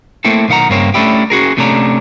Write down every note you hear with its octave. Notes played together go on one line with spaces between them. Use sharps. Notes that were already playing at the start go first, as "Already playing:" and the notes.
A3 A#3 C4 E4 A4
B1 D#3 F5 F#5 A#5
G2 C#3 A#3 C4 C#5
A3 C#4 D4 E4 G4
C#4 F#4 G#4 A#4
C3 A3 C#4 D4 A#5